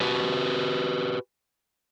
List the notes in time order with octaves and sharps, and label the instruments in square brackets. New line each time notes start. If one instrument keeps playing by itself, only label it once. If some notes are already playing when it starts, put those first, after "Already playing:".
[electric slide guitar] F#4 G4 B4